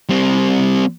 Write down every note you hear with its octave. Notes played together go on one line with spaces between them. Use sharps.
G3 C4